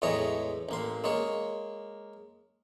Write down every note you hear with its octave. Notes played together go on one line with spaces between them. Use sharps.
E2 A2 E3 G#3 C#5 A#5
A1 A#3 C6
G#3 A#3 C#5